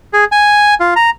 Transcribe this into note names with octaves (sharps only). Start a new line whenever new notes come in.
G#4
G#5
F4
A#5